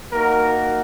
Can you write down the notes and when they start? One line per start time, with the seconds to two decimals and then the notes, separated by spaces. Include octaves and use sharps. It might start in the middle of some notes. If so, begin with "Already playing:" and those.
0.12 A#3 D#4 F#4 A#4